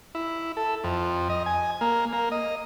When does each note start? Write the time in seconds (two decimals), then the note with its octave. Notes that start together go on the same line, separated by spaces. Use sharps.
0.15 E4
0.57 A4
0.84 F2
1.30 D#5
1.46 G#5
1.81 A#3
2.13 A#3
2.32 D#5